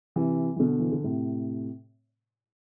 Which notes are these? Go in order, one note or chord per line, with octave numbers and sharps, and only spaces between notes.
C3 E3
E3
B2 D3
E3
D3
A2 C3